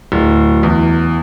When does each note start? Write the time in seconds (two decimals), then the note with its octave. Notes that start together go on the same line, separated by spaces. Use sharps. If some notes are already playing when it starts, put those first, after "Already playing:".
0.12 D1
0.63 E2